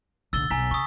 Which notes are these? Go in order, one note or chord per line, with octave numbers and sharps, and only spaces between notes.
A#1 D3 E6 A6 G7
B1 G#5 A#5 B6
C#3 C#6 D#6